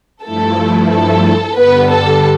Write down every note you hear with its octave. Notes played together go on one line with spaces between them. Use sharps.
G2 F3 A3 E4 A4
A4
G2 D3 G3 B3 B4
A4